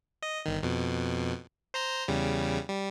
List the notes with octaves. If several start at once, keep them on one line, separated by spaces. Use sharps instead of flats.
D#5
G1 D#3
F2 B2
C5 A#5 C6
E2 C#3 G3
G3